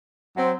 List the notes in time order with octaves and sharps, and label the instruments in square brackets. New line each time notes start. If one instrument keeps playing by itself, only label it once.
[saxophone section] F#3 C4